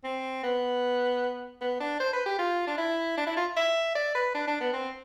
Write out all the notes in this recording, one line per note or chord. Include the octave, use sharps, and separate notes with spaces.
C4
B3
B3
D4
C5
B4
G4
F4
D4
E4
D4
E4
F4
E5
D5
B4
D4
D4
B3
C4